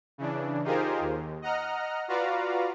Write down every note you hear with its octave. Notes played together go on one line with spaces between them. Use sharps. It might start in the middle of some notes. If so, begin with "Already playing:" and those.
C#3 E3 D4
D#4 F4 G4 G#4 A#4 C5
D#2
D#5 F#5 A#5 F6
F4 F#4 B4 D5 F5 A#5